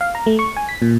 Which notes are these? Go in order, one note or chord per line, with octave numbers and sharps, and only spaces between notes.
F5
A#5
A3
C#6
G#5
B6
A#2